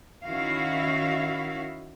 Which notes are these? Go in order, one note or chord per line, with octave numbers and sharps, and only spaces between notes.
D#3 C#4 E4 F#4 F5